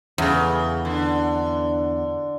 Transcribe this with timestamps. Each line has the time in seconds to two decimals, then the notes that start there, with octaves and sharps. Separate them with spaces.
0.18 E2 C#3
0.85 D3